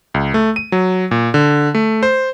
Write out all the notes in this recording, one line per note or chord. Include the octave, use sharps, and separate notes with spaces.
C#2
A3
D#7
F#3
A#2
D3
A3
C5